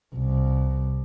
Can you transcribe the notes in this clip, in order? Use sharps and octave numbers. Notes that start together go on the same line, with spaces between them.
C2